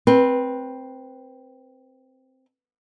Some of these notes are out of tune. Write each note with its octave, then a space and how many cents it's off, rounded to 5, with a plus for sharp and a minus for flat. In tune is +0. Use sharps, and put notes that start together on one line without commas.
C4 +0 B4 -20